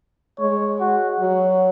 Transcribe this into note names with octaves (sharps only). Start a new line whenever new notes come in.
G#3 C#5
F#4
F#3